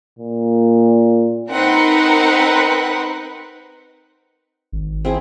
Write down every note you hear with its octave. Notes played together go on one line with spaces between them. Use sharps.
A#2
C4 D#4 A#4 B4 F#5
G#1
C4 E4 G#4